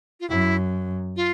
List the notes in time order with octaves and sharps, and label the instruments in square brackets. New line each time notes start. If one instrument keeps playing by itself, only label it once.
[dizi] F4
[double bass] F#2 [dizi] E4
[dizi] F4